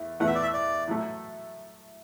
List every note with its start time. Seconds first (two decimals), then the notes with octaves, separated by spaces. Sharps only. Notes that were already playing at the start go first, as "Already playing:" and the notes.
Already playing: E2 A3
0.20 E2 E3 A3 F#5
0.27 E5
0.35 D5
0.42 E5
0.54 D5
0.87 A2 F#3 A3